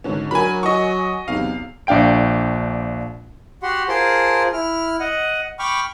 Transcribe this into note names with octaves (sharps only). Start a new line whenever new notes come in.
G#1 G#2 D3 C#4
F#3 D4 F#4 A#4 G#5 B5
F#4 D#5 G#5 C#6
B1 E2 C3 F5
A#1 D4 F5 G5 D7
F#4 G4 F#5 C6
F4 G#4 A#4 C5 A5 C6
E4 F6
D#5 F#5
G5 B5 C#6 D6 F6